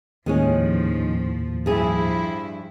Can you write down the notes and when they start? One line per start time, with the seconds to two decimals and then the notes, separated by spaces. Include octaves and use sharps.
0.26 D#2 A2 D#3 F3 G#3 C#4
1.66 G2 F3 E4 G#4